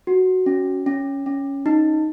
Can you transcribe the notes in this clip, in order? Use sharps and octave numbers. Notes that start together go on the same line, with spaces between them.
F#4
C#4
C#4
C#4
D#4